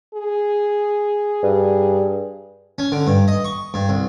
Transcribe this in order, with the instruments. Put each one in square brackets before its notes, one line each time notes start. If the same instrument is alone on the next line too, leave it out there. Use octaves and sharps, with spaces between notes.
[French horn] G#4
[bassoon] G2
[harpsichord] C#4
D3
G2
D#5
C#6
G2
C2